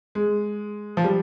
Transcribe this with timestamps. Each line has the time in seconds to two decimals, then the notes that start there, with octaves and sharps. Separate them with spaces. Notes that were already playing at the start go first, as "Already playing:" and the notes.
0.15 G#3
0.97 F3
1.04 G3